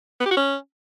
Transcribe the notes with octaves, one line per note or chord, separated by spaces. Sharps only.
B3
G4
F#4
C#4